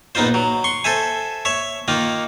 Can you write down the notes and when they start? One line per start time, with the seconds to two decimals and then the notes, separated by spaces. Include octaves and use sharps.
0.15 A#1 B3 D#4 F4 C5
0.34 F#3
0.64 C6 C#6
0.84 A4 C5 E5 G#5
1.45 C#5 E5 C#6
1.88 D#3 A#3 D#4 F4